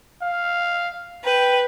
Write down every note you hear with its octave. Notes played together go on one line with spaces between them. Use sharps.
F5
B4 G5